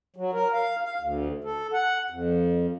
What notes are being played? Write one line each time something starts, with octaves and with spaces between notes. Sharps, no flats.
F#3
A#4
F5
F5
D2
A4
F#5
F2